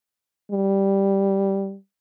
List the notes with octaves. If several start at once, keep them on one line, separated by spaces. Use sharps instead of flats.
G3